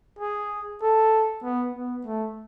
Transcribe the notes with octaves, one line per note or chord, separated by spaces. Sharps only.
G#4
A4
B3
B3
A3